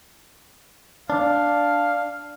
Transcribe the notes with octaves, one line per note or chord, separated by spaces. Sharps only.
D4 F5